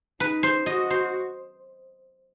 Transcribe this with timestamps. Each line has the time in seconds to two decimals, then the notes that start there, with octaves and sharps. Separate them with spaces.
0.20 D#4 B4
0.43 C5
0.66 F#4 D#5
0.90 C5